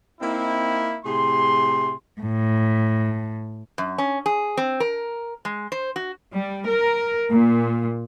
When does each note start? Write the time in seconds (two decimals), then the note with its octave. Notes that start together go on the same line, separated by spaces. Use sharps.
0.21 A#3 C4 D#4 E4
1.05 A2 C3 G#4 C6
2.21 A2
3.78 F#2
3.98 C#4
4.26 G#4
4.57 C4
4.80 A#4
5.45 G#3
5.72 C5
5.96 F#4
6.33 G3
6.67 A#4
7.30 A#2